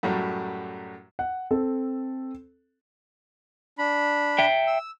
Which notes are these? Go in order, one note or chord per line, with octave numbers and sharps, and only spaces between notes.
F#2 A2 F#3 G3
F#5
C4 A4
D4 B5
E5 G5
E6